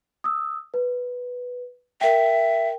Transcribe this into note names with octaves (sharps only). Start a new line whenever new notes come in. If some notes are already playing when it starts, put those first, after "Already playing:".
D#6 E6
B4
A#4 E5 G5